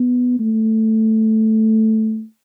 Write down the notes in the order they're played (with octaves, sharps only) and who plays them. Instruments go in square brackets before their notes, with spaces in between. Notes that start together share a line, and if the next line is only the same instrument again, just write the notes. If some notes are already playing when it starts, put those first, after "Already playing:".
Already playing: [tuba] B3
A3